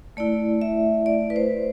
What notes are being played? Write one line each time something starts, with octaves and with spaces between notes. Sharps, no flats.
A3 E4 D5
E5
D5
B4
C5